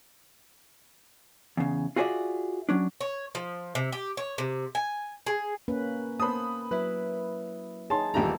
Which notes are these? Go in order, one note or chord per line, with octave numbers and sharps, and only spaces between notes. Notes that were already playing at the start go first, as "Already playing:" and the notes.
E2 C#3
F4 F#4 G#4 B4 D5 E5
F#3 C#4 D4
C#5
F3
C3
G4
C#5
C3
G#5
G#4
A#3 C#4 B4
A#3 B3 C5 A5 B5 D#6
F#3 E4 B4
D#4 G#4 C#5 A5 C6
D#1 A#2 E3 A3 D#4 G4 A#5